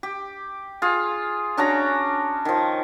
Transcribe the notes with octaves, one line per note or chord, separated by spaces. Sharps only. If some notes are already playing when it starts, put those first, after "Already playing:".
G4
F4 G#4
C#4 D4 F#4 A#5
D#3 F3